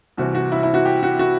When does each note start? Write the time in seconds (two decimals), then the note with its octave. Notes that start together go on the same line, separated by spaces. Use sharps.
0.17 C2 C3 E3 F#4
0.35 F#4
0.52 E4
0.63 E4
0.74 F#4
0.85 G4
1.03 F#4
1.19 F#4